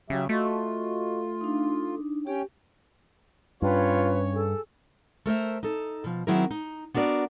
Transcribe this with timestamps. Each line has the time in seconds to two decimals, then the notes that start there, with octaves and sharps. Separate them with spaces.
0.10 C#3 F#3 G4 E5
0.29 A3 F4 F#4 D#5 C#6
1.41 D4 D#4
2.27 C#4 G4 C#5 G5
3.62 G2 C#4 F4 B4 C#5
4.34 G#4 A4
5.26 A3 A#4 C5 E5
5.63 D#4 A4
6.04 B2 F3
6.27 D#3 F#3 C4 E4 G#4 A#4
6.51 D#4
6.94 B3 D4 F#4 A#4 D5